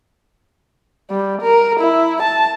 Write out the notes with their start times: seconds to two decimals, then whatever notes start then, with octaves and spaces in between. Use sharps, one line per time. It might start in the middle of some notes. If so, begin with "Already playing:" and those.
1.10 G3
1.42 A#4
1.80 E4
2.23 A5